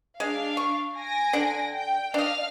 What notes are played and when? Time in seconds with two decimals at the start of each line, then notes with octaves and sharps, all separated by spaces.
0.20 G#3 D4 F5
0.57 C#6
0.96 G#5 A#6 D7
1.33 D3 D4
1.72 G5
2.14 D4 D#5 F5 F6